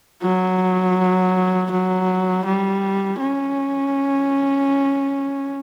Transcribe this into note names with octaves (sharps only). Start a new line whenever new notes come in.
F#3
F#3
G3
C#4